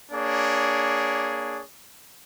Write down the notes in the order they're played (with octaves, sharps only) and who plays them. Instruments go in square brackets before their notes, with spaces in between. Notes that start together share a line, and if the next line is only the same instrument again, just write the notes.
[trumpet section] A#3 D4 G#4 C#5